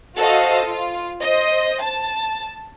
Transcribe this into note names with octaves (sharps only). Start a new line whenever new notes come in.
F#4 A4 C5 D#5 F5
F4
C5 D#5
A5